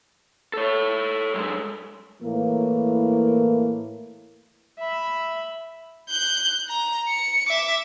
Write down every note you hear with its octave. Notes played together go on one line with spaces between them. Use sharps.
A4 C#5
F#2 G#3
A2 E3 A#3
E5 B5
F#6 G6
A#5
C#7
E5 D6